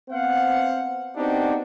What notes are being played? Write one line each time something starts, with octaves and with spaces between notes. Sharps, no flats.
B3 C4 C5 F5 F#5
B3 C4 D4 D#4 F#4 G4